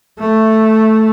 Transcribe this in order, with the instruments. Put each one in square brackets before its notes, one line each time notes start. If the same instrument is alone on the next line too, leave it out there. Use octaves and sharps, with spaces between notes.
[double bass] A3